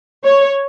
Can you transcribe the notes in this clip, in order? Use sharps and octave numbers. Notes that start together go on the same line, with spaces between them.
C#5